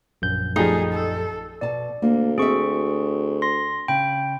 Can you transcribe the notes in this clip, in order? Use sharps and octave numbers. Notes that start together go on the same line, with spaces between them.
A#1 F#2 G6
F3 G3 A3 D#4 G#4
A4
B2 D5 A5
D2 A#3
C4 F#4 G#4 E5 C#6
C6 A#6
C#3 G5 B5